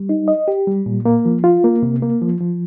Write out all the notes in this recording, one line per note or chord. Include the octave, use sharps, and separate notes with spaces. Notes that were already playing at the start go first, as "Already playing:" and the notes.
Already playing: G3
D#4
D#5
G4
G3
A#2
A#3
F3
F4
A#3
C3
A#3
F3
F3